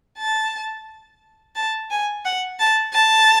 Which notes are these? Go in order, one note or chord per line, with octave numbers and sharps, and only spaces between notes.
A5
A5
G#5
F#5
A5
A5